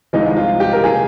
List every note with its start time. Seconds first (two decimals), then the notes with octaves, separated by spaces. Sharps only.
0.13 C2 C3 F3 G#3 D#4
0.36 F4
0.60 G4
0.73 A#4
0.84 C3 F3 A#3 G#4